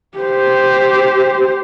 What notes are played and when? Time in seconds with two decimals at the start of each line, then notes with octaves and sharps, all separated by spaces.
0.18 G4 C5